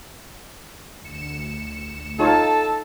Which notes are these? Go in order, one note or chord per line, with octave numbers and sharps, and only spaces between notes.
D2 C#7 E7
D#4 F4 A4 C#5 A5